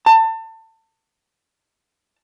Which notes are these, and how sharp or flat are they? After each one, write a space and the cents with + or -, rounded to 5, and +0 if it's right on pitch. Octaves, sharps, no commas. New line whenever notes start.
A5 +30